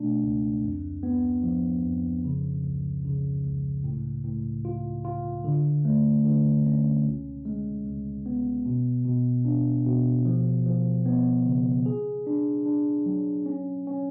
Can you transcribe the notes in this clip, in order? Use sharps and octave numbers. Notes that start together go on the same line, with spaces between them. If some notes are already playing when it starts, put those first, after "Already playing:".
Already playing: B2 A3 D4
C#2
F2
B3
F3
F2
C#3
C#2
C#3
C#2
A2
A2
F4
F4
D3
A3
D3
C#4
C#2
G#3
C#2
B3
B2
B2
D4
B2
F3
F3
B3
C#3
G#4
D4
D4
F#3
C#4
C#4